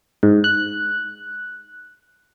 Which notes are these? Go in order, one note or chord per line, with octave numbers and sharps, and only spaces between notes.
G#2
F#6